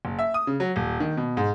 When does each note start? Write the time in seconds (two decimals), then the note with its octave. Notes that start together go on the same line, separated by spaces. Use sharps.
0.05 F#1
0.19 E5
0.34 D#6
0.47 C#3
0.60 F#3
0.76 D#1
1.00 D#3
1.17 B2
1.37 G#2